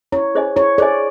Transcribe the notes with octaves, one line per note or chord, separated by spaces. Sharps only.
E4 C#5
G#4 C5 D#5 G#5
E4 C#5
G#4 C5 D5 D#5 G#5